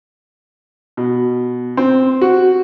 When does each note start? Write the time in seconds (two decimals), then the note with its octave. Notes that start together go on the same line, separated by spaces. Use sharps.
0.97 B2
1.77 C4
2.21 F#4